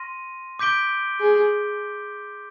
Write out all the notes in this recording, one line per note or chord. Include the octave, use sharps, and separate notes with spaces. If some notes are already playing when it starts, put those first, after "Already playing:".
Already playing: C6 F6 A#6 D#7
D6 G6 B6 D7 G7
G#4